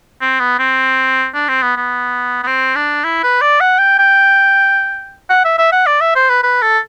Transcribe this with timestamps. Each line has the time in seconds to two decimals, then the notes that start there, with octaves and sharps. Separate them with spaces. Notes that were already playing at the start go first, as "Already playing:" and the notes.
0.21 C4
0.40 B3
0.59 C4
1.34 D4
1.49 C4
1.62 B3
1.76 B3
2.43 B3
2.47 C4
2.76 D4
3.04 E4
3.23 B4
3.41 D5
3.60 F#5
3.79 G5
3.99 G5
5.30 F#5
5.44 E5
5.58 E5
5.72 F#5
5.86 D5
6.01 E5
6.15 C5
6.29 B4
6.43 B4
6.62 A4